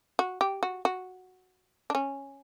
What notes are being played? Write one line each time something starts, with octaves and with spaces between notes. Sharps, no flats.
F#4
G4
F#4
F#4
D4
C#4